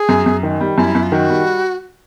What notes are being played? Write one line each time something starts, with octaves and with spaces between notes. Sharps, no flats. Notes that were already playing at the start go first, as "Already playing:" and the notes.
Already playing: G#4
F#2
F#2
D#3
G3
F#2 E4
F#2
F4
D#3 F#4
G3